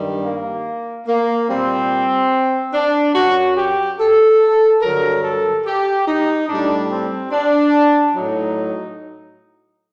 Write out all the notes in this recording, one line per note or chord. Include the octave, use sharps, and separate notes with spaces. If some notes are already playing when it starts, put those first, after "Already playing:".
Already playing: G2 D#3 G3
A#3
A#3
A#2 G3 C4
D4
F#2 F#3 F#4
G4
A4
G2 D3 F#3 A#4
A4
G4
D#4
A2 G3 D4
C4
D4
A2 F#3 D#4